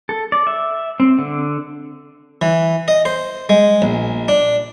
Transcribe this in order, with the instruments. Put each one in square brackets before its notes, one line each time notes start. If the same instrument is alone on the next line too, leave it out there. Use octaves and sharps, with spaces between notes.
[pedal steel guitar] A4
D5
E5
C4
D3
[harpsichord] E3
D#5
C5
G#3
A#1
D4